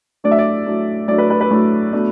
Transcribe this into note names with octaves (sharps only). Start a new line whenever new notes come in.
A2 F#3 A3 D4 D5
E5
D5
A2 F#3 A3 D4
A2 F#3 A3 D4 D5
B4
B4
B4
A2 F#3 A3 D4
B2 A3 D4